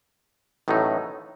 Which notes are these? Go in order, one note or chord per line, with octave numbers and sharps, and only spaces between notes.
A1 A2 F#3 A3 D#4